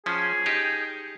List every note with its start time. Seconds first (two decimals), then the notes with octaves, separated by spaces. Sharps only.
0.06 F3 C#4 G#4
0.46 D#4 G4